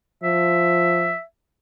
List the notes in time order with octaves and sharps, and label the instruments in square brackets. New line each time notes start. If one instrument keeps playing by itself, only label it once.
[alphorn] F3 [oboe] E5